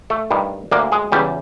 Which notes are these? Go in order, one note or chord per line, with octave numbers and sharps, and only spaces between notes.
A3 A4
G2 D#3
D2 D3 A#3 A#4
G#3 G#4
E2 C#3 E3 G3 G4